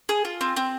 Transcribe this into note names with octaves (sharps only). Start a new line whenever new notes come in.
G#4
F4
C4
C4